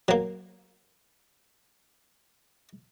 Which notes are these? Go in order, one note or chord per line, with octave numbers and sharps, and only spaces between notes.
F#3 A#3